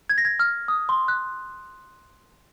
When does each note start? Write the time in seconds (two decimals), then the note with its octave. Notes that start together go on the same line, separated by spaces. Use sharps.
0.09 G#6
0.18 A#6
0.25 G#6
0.40 F6
0.68 D#6
0.89 C6
1.08 F#6